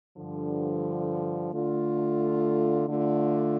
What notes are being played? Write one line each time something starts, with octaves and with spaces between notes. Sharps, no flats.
G2 D3 F3
D3 A3 F4
D3 A3 F4